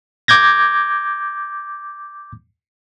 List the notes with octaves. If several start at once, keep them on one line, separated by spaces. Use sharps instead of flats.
D6 G6 G#6 A#6